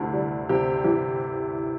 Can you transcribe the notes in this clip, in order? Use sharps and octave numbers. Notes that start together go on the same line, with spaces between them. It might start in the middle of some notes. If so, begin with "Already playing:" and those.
Already playing: D2 C3 E3
G3
C3 G4
E3 G4